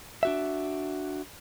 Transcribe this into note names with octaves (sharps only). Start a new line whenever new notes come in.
D4 F#4 E5